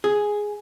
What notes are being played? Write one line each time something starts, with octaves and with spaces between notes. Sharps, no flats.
G#4